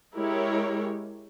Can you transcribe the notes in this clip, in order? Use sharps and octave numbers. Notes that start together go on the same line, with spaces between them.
G#3 E4 G4 A#4 C#5